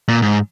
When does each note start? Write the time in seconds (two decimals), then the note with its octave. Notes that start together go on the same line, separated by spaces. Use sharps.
0.08 A#2
0.22 G#2